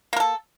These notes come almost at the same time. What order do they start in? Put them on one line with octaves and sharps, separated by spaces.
A#3 A#4 A4